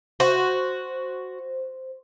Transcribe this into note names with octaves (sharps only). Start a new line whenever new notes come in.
F#4 C5